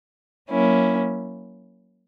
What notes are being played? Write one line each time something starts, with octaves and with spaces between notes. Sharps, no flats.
F#3 A#3 C#4 E4